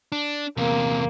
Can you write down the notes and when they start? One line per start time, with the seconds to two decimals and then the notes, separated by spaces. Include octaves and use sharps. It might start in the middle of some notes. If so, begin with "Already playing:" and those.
0.12 D4
0.57 E2 C3 A#3